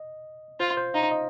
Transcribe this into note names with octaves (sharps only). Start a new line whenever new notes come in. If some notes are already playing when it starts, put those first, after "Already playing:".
Already playing: D#5
F4 C5
C5
D#4 F5
D#5